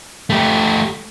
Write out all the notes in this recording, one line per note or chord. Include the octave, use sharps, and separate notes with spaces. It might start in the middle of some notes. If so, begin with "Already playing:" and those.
A3 G4